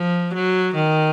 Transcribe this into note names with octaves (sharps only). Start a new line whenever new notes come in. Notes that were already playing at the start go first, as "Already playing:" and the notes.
Already playing: F3
F#3
D#3